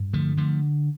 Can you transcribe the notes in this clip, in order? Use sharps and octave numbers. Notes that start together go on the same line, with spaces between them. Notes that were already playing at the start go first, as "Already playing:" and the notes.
Already playing: G2
D3 F3 A3
D3 F3 A3